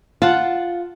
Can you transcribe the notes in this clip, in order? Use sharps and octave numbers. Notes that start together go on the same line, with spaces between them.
F4 F#5 A5